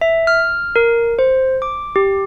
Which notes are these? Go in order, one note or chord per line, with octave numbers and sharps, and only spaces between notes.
E5
F6
A#4
C5
D6
G4